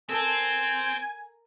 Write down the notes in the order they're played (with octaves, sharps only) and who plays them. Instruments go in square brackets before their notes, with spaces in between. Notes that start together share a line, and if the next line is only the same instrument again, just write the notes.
[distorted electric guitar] C4 [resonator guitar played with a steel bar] A4 A#4 [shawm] G#5